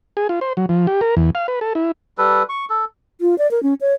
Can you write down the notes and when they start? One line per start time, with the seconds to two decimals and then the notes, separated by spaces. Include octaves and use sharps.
0.17 G#4
0.29 F4
0.41 C5
0.57 F#3
0.69 F3
0.87 G4
1.01 A#4
1.17 E2
1.35 F5
1.48 B4
1.61 A4
1.75 E4
2.18 G3 A4 B4
2.49 C#6
2.70 A4
3.21 F4
3.38 D5
3.51 A#4
3.63 C#4
3.81 C#5